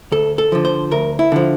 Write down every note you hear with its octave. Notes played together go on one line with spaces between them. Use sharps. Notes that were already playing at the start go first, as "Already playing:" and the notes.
D2 A4
A4
D3 F3
C5
D2 A#4
E4
D3 F3